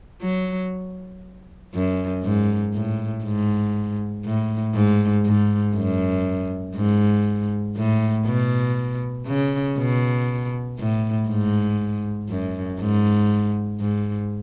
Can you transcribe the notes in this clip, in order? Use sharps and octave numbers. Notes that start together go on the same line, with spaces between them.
F#3
F#2
G#2
A2
G#2
A2
G#2
G#2
F#2
G#2
A2
B2
C#3
B2
A2
G#2
F#2
G#2
G#2